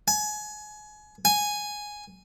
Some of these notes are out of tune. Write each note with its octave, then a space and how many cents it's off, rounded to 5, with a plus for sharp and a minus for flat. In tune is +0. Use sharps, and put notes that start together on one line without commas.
G#5 +30
G#5 +0